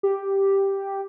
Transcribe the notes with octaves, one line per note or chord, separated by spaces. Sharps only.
G4